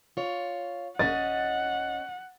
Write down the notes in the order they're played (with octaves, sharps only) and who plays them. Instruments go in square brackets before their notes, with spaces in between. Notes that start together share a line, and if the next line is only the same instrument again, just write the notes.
[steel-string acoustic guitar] F4 C#5
[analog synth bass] D#1 [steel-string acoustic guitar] C#4 D#5 [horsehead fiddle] F#5 [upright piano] A6